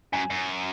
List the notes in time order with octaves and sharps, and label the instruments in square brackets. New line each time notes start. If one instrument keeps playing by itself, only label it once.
[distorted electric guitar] F#2 [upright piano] G#5
[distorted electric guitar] F#2